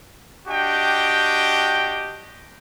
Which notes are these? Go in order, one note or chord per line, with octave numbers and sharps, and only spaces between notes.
D4 F#4 G4 D#5 G5